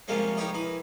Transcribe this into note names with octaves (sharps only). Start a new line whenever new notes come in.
C3 F3 G3 G#3 A#3 C#4
D#4 G4 A#4 B4 C#5 D#5
E3 B5 D#6